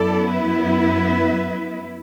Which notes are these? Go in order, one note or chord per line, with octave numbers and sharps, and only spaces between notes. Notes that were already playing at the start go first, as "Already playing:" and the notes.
Already playing: F#2 F#3 B3 E4 A4 D5
B4 E5